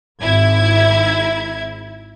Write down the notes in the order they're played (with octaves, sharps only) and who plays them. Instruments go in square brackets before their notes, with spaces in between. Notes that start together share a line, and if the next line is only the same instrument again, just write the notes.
[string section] G#1 E4 G#6